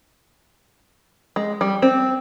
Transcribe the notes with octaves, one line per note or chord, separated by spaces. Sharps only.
G#3
G3
C4